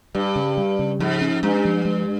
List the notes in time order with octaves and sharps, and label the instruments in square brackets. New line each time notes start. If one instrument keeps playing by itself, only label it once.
[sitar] G2 [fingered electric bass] G3
[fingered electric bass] C#3
G3
C#3
[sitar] G#2 [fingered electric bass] F3
[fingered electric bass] C#4
[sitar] G2 [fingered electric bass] G#3
[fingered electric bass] F3
G#3